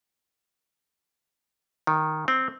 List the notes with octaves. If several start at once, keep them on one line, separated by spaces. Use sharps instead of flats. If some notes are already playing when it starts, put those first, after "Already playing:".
D#3
C4